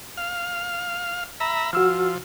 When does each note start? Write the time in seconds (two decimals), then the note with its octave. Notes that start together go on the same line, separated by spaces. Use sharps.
0.17 F5
1.40 E5 A#5 B5
1.73 F3 F#4 E6 F6